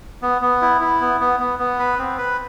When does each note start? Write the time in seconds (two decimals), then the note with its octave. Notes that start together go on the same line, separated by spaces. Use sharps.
0.22 B3
0.42 B3
0.62 E4
0.81 E4
1.01 B3
1.20 B3
1.40 B3
1.59 B3
1.79 B4
1.99 C4
2.18 B4